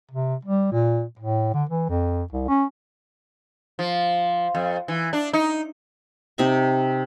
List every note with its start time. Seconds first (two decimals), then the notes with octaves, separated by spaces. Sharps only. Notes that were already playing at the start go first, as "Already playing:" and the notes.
0.11 C3
0.45 G3
0.72 A#2
1.19 A2
1.54 D3
1.69 E3
1.89 F2
2.33 C2
2.48 C#4
3.79 F3
4.55 F2
4.88 E3
5.13 D4
5.33 D#4
6.38 C3 C4 D#4 C#6